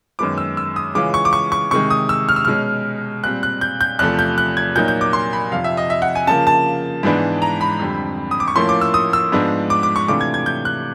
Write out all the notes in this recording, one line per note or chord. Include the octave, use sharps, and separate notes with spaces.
F#2 D#3 G#3 B3 D6
E6
E6
D#6
C#3 E3 G#3 C#4 F4 D6
C#6
D6
C#6
C#6
C3 D#3 G#3 C#6
D#6
E6
F6
E6
B2 G#3 C#4 F6
A#2 G3 C4 F#6
F#6
G6
G6
E2 C3 F3 A3 F#6
G6
F#6
G#6
A#2 F#3 A#3 D#4 G6
G6
D6
C6
B5
F2 C3 F3 F5
E5
D#5
E5
F#5
G#5
C#3 F3 A#3 A5
A5
G#2 E3 G#3 B3 D4
A#5
B5
F2 D3 G3 C4
D#6
D6
C#6
A2 F3 A#3 C#4 E4 C6
D6
E6
D#6
E6
G#2 F3 G#3 B3 D4
D6
D6
C#6
C3 E3 A3 D4 F4 D6
G#6
G#6
G6
F#6